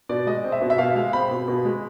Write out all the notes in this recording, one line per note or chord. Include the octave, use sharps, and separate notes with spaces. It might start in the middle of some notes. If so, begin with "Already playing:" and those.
B2 D5
G#3 D#5
C4
E5
B2
E5
B2 F5
G#3 F5
C4 B5
B2
B2
G#3